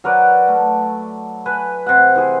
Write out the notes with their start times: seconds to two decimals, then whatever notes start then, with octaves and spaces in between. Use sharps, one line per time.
0.04 F#3 A#4 B4 D5
0.48 A3
1.46 B4 G#5
1.86 C3 F#5
2.16 E3 G#4 C6